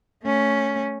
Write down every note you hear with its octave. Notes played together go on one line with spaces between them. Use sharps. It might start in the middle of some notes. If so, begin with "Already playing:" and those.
A3 C#4